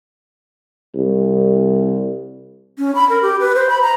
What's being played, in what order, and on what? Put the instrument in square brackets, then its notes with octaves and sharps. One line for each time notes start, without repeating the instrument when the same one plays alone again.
[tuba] C2
[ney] C#4
B5
A#4
G4
B4
C5
B5
A#5